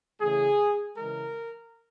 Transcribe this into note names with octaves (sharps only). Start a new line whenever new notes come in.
C#3 E3 A3 G#4
C#3 E3 G#3 A#4